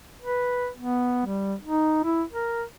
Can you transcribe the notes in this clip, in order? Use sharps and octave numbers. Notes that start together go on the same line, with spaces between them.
B4
B3
G3
D#4
E4
A#4